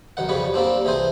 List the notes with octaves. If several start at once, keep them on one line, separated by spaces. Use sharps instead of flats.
B1 D#3 F#5
F2 C#3 G3 B4 C#5
G3 A#3 C4 D4
C2 E3 G#4 C5 G#5